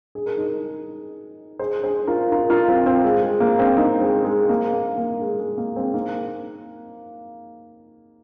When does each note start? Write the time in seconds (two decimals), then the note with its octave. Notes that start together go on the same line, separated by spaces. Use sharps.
0.15 G#4
0.26 A#4
0.37 D#4 G#4
1.59 G#4 C5
1.84 G#4 C5
2.07 F4 A#4
2.32 F4 A#4
2.50 F4 A#4
2.69 C4 F4
2.86 C4 F4
3.04 G#3
3.23 G#3
3.40 A#3
3.59 G#3 C4
3.77 A#3 D#4
4.01 G#3 C4
4.25 G#3
4.49 A#3
4.73 A#3
4.98 A#3
5.21 G#3
5.39 G#3
5.58 A#3
5.76 G#3 C4
5.94 A#3 D#4